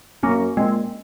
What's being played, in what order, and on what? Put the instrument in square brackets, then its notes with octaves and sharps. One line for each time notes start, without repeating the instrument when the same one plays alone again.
[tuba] F#2 [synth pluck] A#3 C#4
[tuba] A#2 [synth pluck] G#3 C4